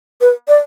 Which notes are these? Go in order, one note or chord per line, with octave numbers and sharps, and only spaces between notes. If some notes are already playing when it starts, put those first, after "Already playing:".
B4
D5